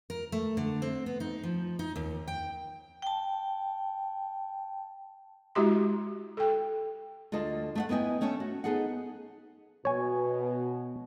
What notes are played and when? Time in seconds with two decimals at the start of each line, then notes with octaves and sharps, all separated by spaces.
0.10 A#4
0.32 A3
0.57 D3
0.82 C4
1.06 B3
1.20 D#4
1.43 F3
1.79 D#4
1.96 D#2
2.28 G5
3.02 G5 A5
5.55 G#3 E4 F#4 G4 E5 C6
6.37 A4 G5
7.32 D2 F4 A4 D#5 A5
7.75 A3 E5 F#5
7.89 B3 E4 D#5 G5 G#5
8.21 A3 C#4 C#5 E5
8.40 F#4
8.64 B3 D#4 G#4 A4 D#5 F#5
9.85 B2 C#5 G#5